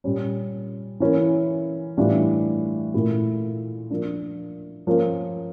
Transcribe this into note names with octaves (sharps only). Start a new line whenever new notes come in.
A#2 G3 C#4
E3 A#3 C#4 E4
A2 E3 G3 D4 F4
A#2 A3 E4
F3 A#3 D4
F3 A#3 C#4